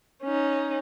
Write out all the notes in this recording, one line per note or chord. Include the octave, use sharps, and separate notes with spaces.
C#4 D#4